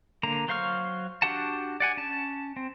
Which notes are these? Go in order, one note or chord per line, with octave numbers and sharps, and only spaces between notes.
D3 A#3 A#5
F#3 C5 F5 C#6 F6
D4 F#4 G4 F#5 A5
D5 F#5 G#5
C#4 A5
C4